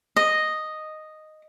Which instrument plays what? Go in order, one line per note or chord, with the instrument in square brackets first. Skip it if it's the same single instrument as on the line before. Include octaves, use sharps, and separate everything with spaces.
[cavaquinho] D#5